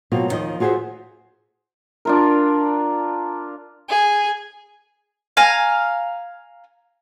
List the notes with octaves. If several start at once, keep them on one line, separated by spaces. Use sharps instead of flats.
B2 F#3 A#3 C4 F4
D#2 A#2 D#3 F3 D#5
F4 F#4 G#4 A#4 C5 E5
D4 F4 A#4
G#4
F5 G#5 A#5